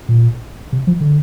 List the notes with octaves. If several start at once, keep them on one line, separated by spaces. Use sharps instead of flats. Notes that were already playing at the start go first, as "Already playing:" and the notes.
A#2
C3
F3
D3